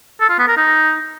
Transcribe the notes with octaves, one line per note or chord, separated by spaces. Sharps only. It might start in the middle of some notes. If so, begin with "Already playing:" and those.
A4
F4
B3
A#4
D#4